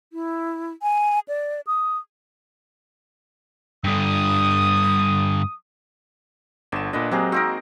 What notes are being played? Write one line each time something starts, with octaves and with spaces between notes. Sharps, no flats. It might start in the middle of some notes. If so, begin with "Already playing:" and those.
E4
G#5
D5
D#6
G2 D3 D#6
G1 D3 E7
A#2 D4 B4 D#5
F#3 G#3 A#3 C4 G4 G#4
C4 D#4 F#4 A#4